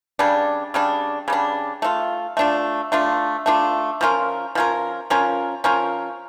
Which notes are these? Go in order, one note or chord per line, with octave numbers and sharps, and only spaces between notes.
C#3 G3 D4
C#3 G3 D4
C#3 G3 D4
A3 D4 F4
A3 D4 F4
A3 D4 F4
A3 D4 F4
F3 C#4 F4 A#4
F3 C#4 F4 A#4
F3 C#4 F4 A#4
F3 C#4 F4 A#4